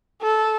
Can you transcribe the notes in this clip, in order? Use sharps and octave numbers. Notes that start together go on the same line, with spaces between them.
A4